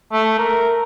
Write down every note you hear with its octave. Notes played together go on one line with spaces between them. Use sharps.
A3
A#4